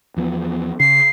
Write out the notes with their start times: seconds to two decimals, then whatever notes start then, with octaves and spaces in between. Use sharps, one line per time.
0.17 E2 F3 B3
0.80 C#3 C7